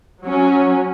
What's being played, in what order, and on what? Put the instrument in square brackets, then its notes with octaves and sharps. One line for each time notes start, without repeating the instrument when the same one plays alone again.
[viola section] F#3 C#4